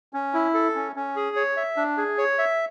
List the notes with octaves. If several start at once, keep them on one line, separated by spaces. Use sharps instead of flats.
C#4
E4
A4
C#4
C#4
G#4
C#5
E5
D4
G#4
C#5
E5